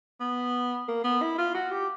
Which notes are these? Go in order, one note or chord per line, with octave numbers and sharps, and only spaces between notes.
B3
A#3
B3
E4
F4
F#4
G4